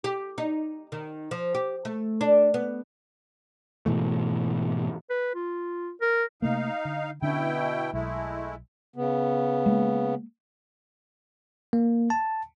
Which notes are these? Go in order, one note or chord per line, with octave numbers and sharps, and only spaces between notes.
G4
D#4
D#3
F3
G4
A3
D4
B3
G#2 B2 E3 A3
B4
F4
A#4
C3 A3 A#3 D#4 F5
D3
B2 D3 C#4 D4 E4 G5
B1 G#3 A3 E4
C#3 B3
G#3 A#3
A#3
A5